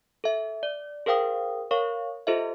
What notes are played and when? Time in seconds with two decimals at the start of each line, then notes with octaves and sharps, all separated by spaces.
0.24 A4 E5
0.63 D5
1.06 G#4 A#4 C5 F5 G5 D#6
1.71 A#4 C#5 F5 C#6
2.27 F4 G4 A4 C5 D#5 E5